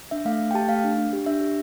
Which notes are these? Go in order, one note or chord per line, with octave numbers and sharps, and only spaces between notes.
D4 E5
A3 F5
A3
G5
G4 A5
A3 F5
D4
D4
G4
D4 E5
G4